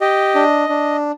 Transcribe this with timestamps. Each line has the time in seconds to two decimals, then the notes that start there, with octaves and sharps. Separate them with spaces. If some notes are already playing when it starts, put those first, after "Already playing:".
0.01 G4 D#5
0.35 D4
0.69 D4